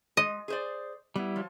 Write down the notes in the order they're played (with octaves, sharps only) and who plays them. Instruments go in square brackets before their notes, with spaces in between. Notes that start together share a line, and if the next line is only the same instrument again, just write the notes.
[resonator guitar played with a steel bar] G#3 [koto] D#5
[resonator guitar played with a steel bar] G#4 C5 D5
[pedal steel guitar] G3 E4 [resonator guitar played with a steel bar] B3
[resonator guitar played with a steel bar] F3 F#3